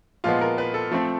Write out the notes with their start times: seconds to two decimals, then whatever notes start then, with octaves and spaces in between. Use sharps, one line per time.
0.24 A#2 F3 G#3 B3 F4
0.41 A#4
0.58 B4
0.74 A4
0.91 F3 A3 C4